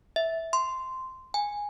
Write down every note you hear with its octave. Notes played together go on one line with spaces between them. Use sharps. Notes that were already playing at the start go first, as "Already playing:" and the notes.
E5
C6
G#5